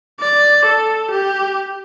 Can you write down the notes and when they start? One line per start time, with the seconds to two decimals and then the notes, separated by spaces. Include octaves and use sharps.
0.20 D5
0.65 A4
1.11 G4